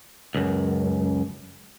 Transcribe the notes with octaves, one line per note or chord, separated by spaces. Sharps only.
C#2 F#2